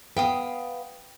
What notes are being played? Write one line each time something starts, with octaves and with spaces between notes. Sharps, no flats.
B3 F5 G5 D#6